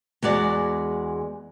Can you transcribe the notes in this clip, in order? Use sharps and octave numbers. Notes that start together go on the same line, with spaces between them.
E2 G#3 F#4 D5